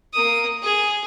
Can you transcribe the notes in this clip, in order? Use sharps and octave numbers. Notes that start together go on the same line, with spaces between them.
A#3 D#6
G#4